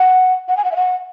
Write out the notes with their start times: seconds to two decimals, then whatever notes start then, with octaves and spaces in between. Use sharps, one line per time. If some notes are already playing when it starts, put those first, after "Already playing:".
Already playing: F#5
0.48 F#5
0.57 G#5
0.64 F#5
0.71 E5
0.76 F#5